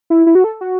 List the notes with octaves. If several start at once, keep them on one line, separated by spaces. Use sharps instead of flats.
E4
E4
F#4
A4
F#4